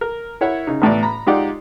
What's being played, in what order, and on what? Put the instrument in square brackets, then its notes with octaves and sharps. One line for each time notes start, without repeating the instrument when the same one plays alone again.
[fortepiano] A#4
E4 A#4 C#5 E5 F#5
C#3 D#4
A1 A2 B3 D5
A#5 B5
G#3 D#4 F4 G4 D5 F#5